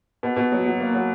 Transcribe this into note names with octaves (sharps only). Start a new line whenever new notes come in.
B2
B2
F#3
F#3
A#3
F#3